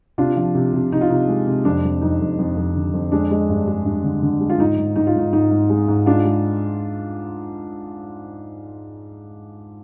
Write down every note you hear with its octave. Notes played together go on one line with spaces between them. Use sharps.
C3 D4 F4
F3
C3
C3
C3 D#4
F4
C3 D#4
G#3
C3
F2 D4
F2
F2 D#4
F2
F2
F2
D3
F2
G#3 D4
G#3
G2
G#3
G2
D3
D3
G#3
F4
G#2 D#4
G#2
G#2 D#4
F4
G#2 D#4
G#2 D#4
G#2
G#3
G#2
G#3 D4 F4
G#3